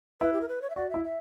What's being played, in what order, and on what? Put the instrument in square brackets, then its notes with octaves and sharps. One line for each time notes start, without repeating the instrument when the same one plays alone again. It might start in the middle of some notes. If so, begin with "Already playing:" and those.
[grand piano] E4 [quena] B4
[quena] G4
A#4
B4
C#5
E5
[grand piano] F#4 [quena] D5
[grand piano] E4 [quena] E5
[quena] E5